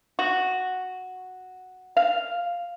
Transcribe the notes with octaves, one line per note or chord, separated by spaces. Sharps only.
F#4
F5